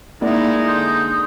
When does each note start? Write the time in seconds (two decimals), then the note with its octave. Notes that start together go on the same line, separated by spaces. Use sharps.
0.22 G#3 A#3 D#4 E4 D5 F#5
0.65 D3 C6 D#6 G6